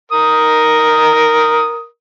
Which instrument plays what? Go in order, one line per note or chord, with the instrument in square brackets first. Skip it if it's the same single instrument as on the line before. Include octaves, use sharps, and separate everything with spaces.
[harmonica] A#4 D#6